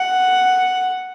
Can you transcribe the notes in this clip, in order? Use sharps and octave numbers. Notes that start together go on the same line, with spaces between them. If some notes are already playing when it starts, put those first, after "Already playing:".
Already playing: F#5